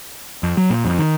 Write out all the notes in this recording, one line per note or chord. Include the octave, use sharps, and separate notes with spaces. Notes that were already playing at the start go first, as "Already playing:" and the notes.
F2
F#3
A#2
F2
D#3